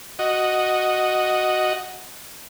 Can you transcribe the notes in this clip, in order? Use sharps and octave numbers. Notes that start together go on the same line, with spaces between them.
F#4 D#5